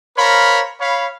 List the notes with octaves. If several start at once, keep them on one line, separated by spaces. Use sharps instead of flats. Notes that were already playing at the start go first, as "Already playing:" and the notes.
A#4 C5 C#5 F5 B5
C#5 F5 B5